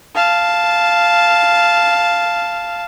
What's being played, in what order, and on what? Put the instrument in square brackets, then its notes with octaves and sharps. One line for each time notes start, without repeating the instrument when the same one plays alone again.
[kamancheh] F5 A5